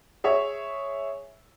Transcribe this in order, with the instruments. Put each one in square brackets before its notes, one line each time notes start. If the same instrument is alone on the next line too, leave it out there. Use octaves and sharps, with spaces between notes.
[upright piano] G#4 C#5 E5